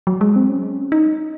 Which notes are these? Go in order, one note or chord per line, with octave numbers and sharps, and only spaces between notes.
F#3
G#3
C4
C#4
D#4